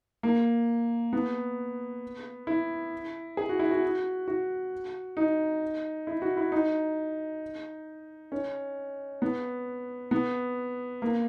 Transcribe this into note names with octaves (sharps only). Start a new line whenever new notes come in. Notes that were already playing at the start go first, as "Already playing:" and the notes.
A#3
B3
E4
G#4
F#4
E4
F#4
F#4
D#4
E4
F#4
E4
D#4
C#4
B3
B3
A#3